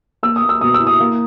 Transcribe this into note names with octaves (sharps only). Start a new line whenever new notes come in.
A#3 E6
D#6
A#3
E6
B2 D#6
E6
E4
D#6
A#3